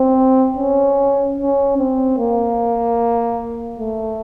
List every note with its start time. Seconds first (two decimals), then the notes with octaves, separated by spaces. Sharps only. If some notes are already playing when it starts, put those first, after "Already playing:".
Already playing: C4
0.57 C#4
1.38 C#4
1.78 C4
2.18 A#3
3.80 A3